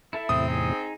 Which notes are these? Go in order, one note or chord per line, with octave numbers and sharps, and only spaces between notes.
E4 A4 E5
E2 A2 C3 C4 D#6
D#4 G#4